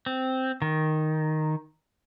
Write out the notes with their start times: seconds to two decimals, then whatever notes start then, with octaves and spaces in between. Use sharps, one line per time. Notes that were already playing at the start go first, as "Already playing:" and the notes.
0.06 C4
0.62 D#3